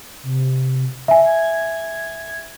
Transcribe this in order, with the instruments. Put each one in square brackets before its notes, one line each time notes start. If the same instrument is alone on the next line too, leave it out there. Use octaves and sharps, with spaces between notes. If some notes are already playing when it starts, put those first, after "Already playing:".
[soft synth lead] C3
[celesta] E5 G#5
[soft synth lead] G#6